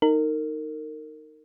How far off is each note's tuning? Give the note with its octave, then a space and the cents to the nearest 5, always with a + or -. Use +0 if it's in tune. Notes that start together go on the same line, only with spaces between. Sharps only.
D#4 +0 A#4 -25